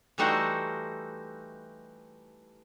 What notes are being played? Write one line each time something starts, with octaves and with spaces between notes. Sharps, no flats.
E3 G3 A3 D#4 F#4 C5